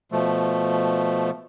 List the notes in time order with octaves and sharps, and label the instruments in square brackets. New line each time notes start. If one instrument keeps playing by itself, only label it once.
[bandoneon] B2 F3 A3